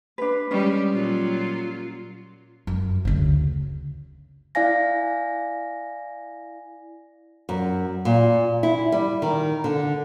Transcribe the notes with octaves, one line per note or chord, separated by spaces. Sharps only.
D4 B4
G3 G#3 C#4
A#2 F#3 F4
F#2
D2 C#3
E4 D5 F5 G#5 A#6
F#2
A#2
E4
G3
D#3
D3